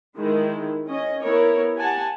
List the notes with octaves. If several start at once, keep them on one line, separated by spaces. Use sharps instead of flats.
D#3 G#3 E4
C#4 D#5
B3 E4 A#4 C#5
G4 F#5 G#5 A5